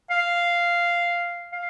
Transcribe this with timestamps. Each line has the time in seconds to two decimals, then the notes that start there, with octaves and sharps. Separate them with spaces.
0.10 F5
1.53 F5